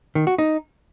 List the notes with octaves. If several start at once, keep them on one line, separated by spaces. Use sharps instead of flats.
D#3
F#4
D#4